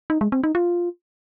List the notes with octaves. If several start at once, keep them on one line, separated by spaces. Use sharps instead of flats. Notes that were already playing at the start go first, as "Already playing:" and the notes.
D#4
G#3
C4
D#4
F4